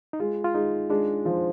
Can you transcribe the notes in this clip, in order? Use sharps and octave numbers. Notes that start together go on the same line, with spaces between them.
D#4
G#3 F4
F4
G#3 D#4
G#3 D4
F3